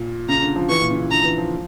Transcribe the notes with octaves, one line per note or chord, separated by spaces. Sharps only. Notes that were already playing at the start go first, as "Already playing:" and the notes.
Already playing: A#2
C#3 A#5
D3
F3
E3 C#6
A#2
C#3
D3 A#5
E3
F3